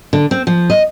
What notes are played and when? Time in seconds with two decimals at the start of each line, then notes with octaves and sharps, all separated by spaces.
0.13 D3
0.31 C4
0.47 F3
0.70 D#5